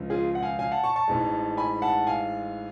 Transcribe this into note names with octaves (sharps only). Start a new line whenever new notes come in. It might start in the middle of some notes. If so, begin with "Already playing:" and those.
Already playing: C#2 C#3 F3
F4 G#4
F#5
F5 G#5
F5 G#5
F#5 A5
A5 C#6
A5 C#6
A1 G#2 G#3
G#5 B5
F#5 A5
F5 G#5